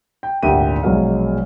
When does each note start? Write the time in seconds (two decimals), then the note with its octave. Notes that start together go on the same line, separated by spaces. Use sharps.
0.23 G5
0.43 G#1 D2 A#2 D#3 G4 D#7
0.83 A#1 B2 F#3 G#3 F5